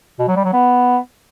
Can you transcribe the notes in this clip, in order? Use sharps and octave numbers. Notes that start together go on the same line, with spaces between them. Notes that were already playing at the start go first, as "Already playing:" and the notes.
B2
F#3
G3
F#3
B3